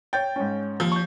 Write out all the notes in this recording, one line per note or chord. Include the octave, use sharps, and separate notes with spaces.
C#5 G5 G6 A6
G#2 C#4
D#2 F3
C#6 G6